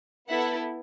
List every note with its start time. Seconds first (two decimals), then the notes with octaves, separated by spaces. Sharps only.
0.29 B3 E4 A4 E5 F#5